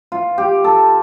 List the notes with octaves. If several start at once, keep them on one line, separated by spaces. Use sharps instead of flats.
F4
G4
A4